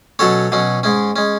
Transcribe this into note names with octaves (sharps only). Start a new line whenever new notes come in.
B2 F#3 C#4 A4 C#5
B2 F#3 C#4
G#2 G#3 C#4
G#3 C#4